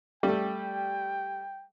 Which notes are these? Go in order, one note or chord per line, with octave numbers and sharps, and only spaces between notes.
G3 A3 G5